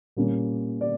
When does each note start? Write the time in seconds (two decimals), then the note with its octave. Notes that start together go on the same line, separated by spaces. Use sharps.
0.17 A#2 G3 A#3 C#4
0.81 D5